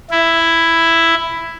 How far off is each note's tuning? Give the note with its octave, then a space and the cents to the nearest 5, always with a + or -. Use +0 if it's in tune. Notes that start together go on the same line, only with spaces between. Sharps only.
E4 +5